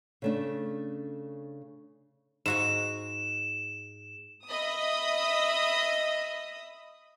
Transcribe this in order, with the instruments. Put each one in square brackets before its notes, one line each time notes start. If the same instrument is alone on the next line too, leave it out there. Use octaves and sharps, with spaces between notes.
[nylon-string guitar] C#3 A3 D4
[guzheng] G#2 F#4 G#5 [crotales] E7
[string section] D#5 E5 B5 D#6